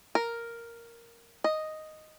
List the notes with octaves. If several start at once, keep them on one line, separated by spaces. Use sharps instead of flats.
A#4
D#5